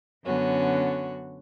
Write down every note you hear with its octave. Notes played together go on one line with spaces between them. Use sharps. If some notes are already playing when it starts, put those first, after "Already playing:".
F#2 D3 B3 C#4 F#4